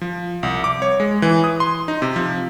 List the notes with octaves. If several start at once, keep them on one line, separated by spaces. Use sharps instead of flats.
F3
C2
D6
C#5
G#3
E3
D#6
C6
D#4
C3
F3